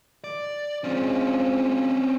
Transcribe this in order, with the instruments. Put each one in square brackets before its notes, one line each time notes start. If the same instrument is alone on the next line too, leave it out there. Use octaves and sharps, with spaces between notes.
[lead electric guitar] D5
[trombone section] F3 F#3 G#3 [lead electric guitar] C4 C#4